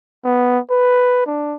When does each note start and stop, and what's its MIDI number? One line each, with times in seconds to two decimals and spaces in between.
0.25 0.59 59
0.70 1.23 71
1.27 1.57 62